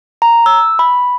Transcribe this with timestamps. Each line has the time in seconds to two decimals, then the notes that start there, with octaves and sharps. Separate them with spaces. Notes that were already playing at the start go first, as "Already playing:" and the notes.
0.22 A#5
0.46 E6
0.79 B5